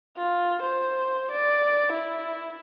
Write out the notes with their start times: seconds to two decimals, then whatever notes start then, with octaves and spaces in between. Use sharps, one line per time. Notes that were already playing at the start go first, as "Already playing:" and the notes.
0.17 F4
0.62 C5
1.31 D5
1.92 E4